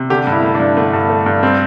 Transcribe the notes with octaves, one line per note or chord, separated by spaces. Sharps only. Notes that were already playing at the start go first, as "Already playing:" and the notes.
Already playing: C3
D3 G4
G2
E4
A3
D4
G2
D3 A3
G2
A3
G2
G3 C4